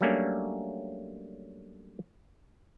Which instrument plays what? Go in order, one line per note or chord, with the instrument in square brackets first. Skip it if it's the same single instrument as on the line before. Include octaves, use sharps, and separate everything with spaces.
[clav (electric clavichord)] F#3 G3 A3 A#3 C#4 D4